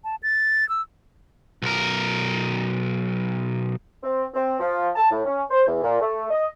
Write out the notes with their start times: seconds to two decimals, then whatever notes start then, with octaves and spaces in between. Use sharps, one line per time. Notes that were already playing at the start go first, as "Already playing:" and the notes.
0.04 A5
0.23 A6
0.69 E6
1.62 B1 A#4
4.03 C4
4.34 C4
4.60 F3
4.96 A5
5.10 A2
5.25 C#4
5.50 C5
5.66 E2
5.83 A#2
6.01 A3
6.31 D#5